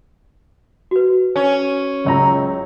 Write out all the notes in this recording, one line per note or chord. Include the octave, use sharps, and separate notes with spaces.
F#4 B4
C#4
F#1 C#2 A#5